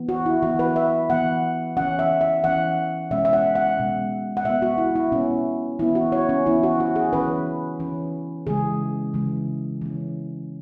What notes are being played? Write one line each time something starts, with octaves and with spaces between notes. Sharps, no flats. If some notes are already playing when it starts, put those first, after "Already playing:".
Already playing: E3 B3
F#4
E4
E3 B3 F#4
B4
E5
E3 B3 F#5
E3 C#4 F#5
E5
E5
E3 C#4 F#5
B2 G#3 C#4 E5
E5
F#5
F#5
B2 G#3 C#4
F#5
B2 B3 E5
F#4
E4
E4
B2 B3 C#4
E3 B3 E4
F#4
C#5
C#4
E3 B3 E4
F#4
F#4
G#4
E3 C#4 B4
E3 C#4
C#3 E3 G#3 G#4
C#3 E3 G#3
E3 C#4